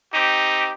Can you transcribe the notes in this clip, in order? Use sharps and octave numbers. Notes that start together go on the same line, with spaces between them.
C4 D#4 G4